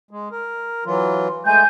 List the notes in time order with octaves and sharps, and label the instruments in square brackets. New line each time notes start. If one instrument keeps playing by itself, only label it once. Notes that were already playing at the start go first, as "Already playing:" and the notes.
[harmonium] G#3
A#4
E3 F#3 F4
[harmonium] G#3 A3 [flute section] G#5 G6